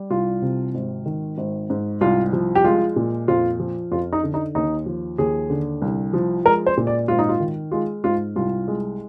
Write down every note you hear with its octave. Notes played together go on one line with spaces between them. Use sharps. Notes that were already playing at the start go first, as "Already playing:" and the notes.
Already playing: G3
C2 F4
C3
G#1
D#3
G#1
G#2
C2 F4
F3
G4
G#3 F4
A#2
F2 F4
F3
F2 F4
D#4
D3
D#4
D#2 D#4
F3
D#2 G#4
D3
C2
F3
G#3 A#4
C5
A#2
D5
G#1 F4
D#4
F4
D#3
G#3 F4
G#2 F4
C2 F4
G#3